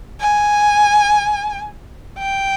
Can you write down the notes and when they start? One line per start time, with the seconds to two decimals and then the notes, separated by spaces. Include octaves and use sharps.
0.21 G#5
2.19 G5